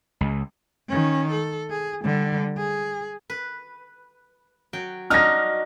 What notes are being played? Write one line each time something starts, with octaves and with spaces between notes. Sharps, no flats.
C#2
D#3 C#4
A4
G#4
D3 G3
G#4
B4
F#3 G5
D4 D#4 F#4 F6 A#6